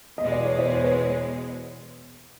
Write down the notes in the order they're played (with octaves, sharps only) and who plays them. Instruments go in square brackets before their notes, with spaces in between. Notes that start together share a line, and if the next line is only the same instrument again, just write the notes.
[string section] E2 B2 G#3 [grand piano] D#5
[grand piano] D5
C#5
C5 D5
C5
B4 C#5